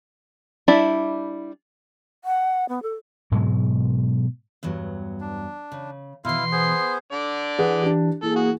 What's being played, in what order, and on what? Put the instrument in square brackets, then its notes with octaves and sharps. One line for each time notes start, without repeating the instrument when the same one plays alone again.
[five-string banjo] G3 D4 E4 D5 E5
[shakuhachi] F#5
B3
A4
[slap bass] G#2 B2 F#3 G#3
[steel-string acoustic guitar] E2 G2 F#3
[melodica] D4
[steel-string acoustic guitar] C#3
[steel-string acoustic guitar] B2 E3 [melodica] E4 F5 [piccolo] C6
[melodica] B3 G#4 C5
[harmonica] D3 D5
[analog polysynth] E3 [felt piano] G#4 B4 F#5
[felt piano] D4 G4
[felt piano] E3 [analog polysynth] A#3 G#4 [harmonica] A4
[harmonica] F#4